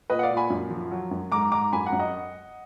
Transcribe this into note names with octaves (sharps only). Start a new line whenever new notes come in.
A#2 B4 D#5
F#5
D5 F5
A#2
G#5 B5
F#2
F3
F#3
F#2
G#2 A#5 D6
G#2 A#5 D6
F#2 G#5 B5
F#5 A#5
F#2
D#5 F#5